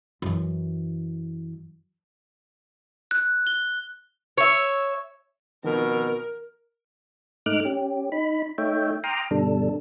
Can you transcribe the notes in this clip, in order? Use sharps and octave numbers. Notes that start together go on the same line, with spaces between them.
F#2 E3
F#6
G7
C#5 E5
B2 D#3 F3 C4 A#4
G#2 A3 D#4 D6 F6 F#6
C#4 G4
D#4 B5
A3 D#4 C#5 E5 G5
G5 A#5 C6 D6 D#6 F6
G2 B2 D3 G3 D4 A4